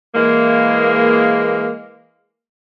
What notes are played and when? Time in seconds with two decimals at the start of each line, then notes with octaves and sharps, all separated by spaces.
0.15 E3 G#3 A#3